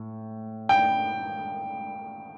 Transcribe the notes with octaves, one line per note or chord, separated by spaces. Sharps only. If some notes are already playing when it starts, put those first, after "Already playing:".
Already playing: A2
G5